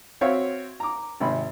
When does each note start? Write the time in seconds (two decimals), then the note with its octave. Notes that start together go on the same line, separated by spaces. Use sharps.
0.21 C4 F#4 C#5 E5 F5
0.80 A#5 D6
1.20 G#1 C3 B5